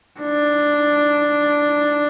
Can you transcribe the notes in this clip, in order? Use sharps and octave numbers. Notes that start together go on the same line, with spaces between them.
D4